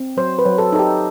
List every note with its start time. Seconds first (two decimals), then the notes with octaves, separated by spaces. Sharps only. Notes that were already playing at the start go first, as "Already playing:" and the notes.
Already playing: C4
0.17 F#3 C5
0.39 B4
0.45 F#3
0.58 A4
0.73 D#4 A4
0.79 G4